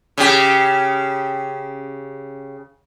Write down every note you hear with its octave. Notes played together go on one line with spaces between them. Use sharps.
C#3 G4